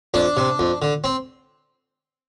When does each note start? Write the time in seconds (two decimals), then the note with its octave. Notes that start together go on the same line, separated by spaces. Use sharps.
0.14 F2 D4
0.37 C3
0.59 F2
0.82 D3
1.04 C4